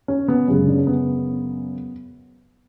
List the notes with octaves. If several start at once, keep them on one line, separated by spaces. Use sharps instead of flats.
C#4
B3
F#2 C#3 G#3 C#4
D4
C#4
B3